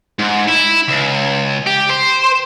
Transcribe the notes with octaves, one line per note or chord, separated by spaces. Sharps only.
G#2
E4
C#2
G4
C5